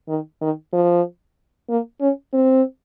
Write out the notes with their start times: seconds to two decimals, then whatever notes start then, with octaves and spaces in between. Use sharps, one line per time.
0.08 D#3
0.41 D#3
0.73 F3
1.70 A#3
2.01 C#4
2.33 C4